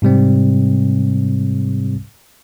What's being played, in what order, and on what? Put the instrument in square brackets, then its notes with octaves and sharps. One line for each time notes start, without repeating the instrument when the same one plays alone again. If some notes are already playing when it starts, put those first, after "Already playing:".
[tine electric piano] G#2 C3 G3 C4